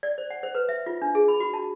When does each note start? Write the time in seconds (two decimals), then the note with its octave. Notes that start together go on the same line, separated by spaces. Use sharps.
0.03 D5
0.18 C5
0.30 F#5
0.43 C5
0.55 B4
0.69 E5
0.86 F4
1.02 D4
1.15 G#4
1.28 B5
1.40 F#4
1.53 A5